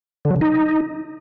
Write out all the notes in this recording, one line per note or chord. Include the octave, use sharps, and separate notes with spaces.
D3
F#3
C#3
D#4